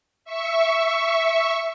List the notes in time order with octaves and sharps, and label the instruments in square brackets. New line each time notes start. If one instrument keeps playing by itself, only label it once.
[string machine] E5 C#6